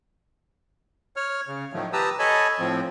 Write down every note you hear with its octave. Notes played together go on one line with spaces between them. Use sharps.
C#5 F6
C#3
A2 D#3 F3 F#3 A3
G4 B4 A5 A#5 D#6 E6
A4 C#5 D#5 G#5 A5 B5
A2 F3 C4